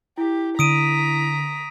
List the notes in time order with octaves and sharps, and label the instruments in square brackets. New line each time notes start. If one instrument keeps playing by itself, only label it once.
[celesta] E4 [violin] G4
[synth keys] D3 [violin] A#5 B6 [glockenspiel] D#6 D7 D#7